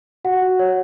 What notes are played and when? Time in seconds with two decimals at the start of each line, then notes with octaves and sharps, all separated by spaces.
0.25 F#4 F#5
0.42 F#4
0.59 C#5